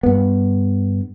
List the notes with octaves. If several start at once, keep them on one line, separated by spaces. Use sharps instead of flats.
G2 B3